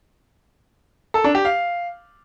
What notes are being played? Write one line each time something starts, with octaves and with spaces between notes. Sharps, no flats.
A4
D4
G4
F5